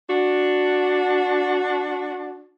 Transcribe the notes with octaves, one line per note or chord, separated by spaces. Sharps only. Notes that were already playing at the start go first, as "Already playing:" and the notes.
D4 F#4